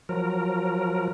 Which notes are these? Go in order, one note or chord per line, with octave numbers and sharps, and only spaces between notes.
F3 F#3 A#4